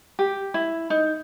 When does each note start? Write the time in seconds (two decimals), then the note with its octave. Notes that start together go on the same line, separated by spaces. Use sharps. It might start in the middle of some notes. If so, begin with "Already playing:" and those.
0.19 G4
0.54 E4
0.90 D#4